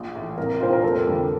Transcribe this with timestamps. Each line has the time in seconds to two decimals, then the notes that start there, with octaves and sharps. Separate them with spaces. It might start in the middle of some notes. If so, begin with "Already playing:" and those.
Already playing: A#1
0.15 A2 E3
0.37 C2 A#4
0.60 A#2 G3 D4 F4 C5
0.73 A#4
0.83 F1 A4
1.06 F2 D3 G3 A#3